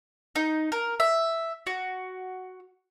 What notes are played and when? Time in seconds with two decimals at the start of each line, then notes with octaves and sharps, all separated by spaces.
0.36 D#4
0.72 A#4
1.00 E5
1.67 F#4